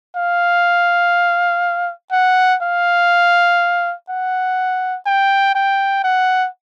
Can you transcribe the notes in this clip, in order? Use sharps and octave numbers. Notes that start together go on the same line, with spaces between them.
F5
F#5
F5
F#5
G5
G5
F#5